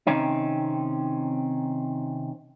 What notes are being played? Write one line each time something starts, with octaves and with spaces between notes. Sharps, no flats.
C3 D#3 C4 C#4 D#4